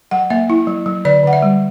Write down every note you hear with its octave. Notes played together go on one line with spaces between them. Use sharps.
F#3 F#5
A#3 E5
E4
F#3
F#3
D3 D5
D3 F#5
E5
G3